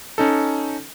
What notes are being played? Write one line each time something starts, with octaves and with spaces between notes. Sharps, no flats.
C#4 D#4 A4